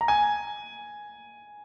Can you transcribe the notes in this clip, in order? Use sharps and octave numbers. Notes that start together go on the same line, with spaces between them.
A#5
G#5